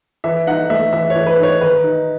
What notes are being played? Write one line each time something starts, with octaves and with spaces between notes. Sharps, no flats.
E3 E5
D#4 F#5
A3 E5
E3 E5
C#5
E3
B4
D#4 C#5
D#3 B4
D#4